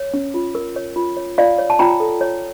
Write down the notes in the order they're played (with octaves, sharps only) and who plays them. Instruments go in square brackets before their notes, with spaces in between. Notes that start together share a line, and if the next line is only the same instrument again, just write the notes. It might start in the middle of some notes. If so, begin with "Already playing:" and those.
Already playing: [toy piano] C#5
C#4
F4
A#4
C#5
F4
C#5
F4 D5 F5
C#5
A5
F4 G5 A#5
A4
C#5